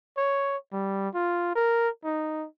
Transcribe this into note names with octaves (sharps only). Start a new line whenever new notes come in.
C#5
G3
F4
A#4
D#4